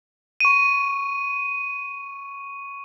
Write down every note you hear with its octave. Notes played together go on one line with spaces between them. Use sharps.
C#6 D#7